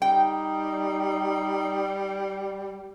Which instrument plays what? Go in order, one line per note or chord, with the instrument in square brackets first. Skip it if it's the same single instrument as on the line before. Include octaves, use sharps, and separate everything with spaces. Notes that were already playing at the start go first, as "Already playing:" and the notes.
[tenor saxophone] G3 [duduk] D#4 [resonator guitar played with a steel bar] G5